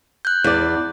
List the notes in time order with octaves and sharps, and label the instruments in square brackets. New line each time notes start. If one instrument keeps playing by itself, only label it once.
[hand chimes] F#6 G6
[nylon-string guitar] E2 D5